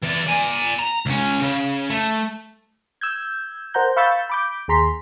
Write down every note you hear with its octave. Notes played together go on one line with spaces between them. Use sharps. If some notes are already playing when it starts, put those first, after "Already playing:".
E3 D5
D5 G#5
A#5
C#2 C#4
C#3
A3
E6 G6 G#6
A#4 C5 F#5 A#5 G6
F5 B5 C#6 E6 G6 A6
B5 D6 G6
D#2 G#4 A#5 C6 B6